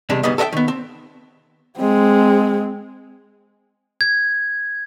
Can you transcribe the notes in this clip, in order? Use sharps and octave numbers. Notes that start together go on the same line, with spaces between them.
E2 C3 G3 G#3 D4
D2 G#2 G3 B3 D#5
A4 A#4 D#5 E5 G5
D#3 B3
C4
G#3 C4
G#6